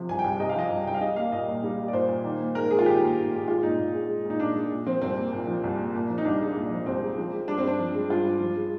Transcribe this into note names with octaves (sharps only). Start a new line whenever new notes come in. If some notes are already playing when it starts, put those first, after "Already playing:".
Already playing: C3 F3
C2 G#5
G5
C2
C3 D#5
F5
F3 D#5
C2
C2 G5
F5
G3 D#5
A#3 F5
A#2 D#5
A#2
G3
A#3
D5
A#2 C5
A#2
D#3
A#3
G#2 A#4
G#2 G#4
F4
D#3 G4
A#3
G#2
G#2
G#3 F4
A#2 D#4
A#2
G#3
G#3
A#2
D#4
A#2 D4
G#3
A#2
F3 C4
C2 C4
A#3
A#2
F3
C2
A#3
A#2
F3
D#4
C2 D4
G#3
A#2
F3
C2 C4
G#3
F3
G#3
G2 D4
C4
G2 D4
F3
G#3
G2 F4
G2
F3
G#3